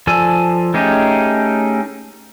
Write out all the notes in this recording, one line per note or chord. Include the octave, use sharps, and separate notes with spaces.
F3 A4 D5 G#5 E6
A3 C#4 D#4 G4 G#4